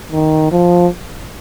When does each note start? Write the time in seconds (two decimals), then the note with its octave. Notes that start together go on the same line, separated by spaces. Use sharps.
0.12 D#3
0.52 F3